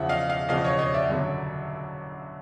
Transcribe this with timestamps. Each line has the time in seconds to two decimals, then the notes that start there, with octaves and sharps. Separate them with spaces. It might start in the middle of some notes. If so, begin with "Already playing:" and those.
Already playing: E2 C#3 F3 E5 F#5
0.09 D#5 F5
0.29 D#5 F5
0.49 E2 C#3 F3 D#5 F5
0.64 C#5 D#5
0.79 C#5 D#5
0.94 D5 E5
1.09 F#1 F#2 D3 F#3